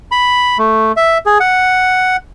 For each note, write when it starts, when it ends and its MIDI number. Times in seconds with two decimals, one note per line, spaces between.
0.12 0.58 83
0.58 0.92 57
0.97 1.18 76
1.26 1.38 68
1.40 2.16 78